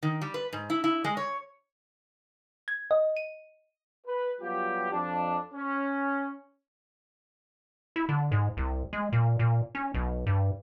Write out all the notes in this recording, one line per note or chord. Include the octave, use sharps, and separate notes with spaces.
D#3
G3
B4
G#2
E4
E4
G#3
C#5
G#6
D#5
D#7
B4
F#3 G3 B3 F4 G4
F2 D4
C#4
E4
D3
G#2
C2
G#3
A#2
A#2
C#4
B1
G2